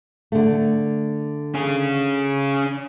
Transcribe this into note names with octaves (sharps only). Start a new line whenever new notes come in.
D3 A3
C#4 G#4